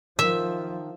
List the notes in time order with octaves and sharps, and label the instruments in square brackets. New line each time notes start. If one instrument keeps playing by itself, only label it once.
[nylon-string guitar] D#3 [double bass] F3 [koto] E5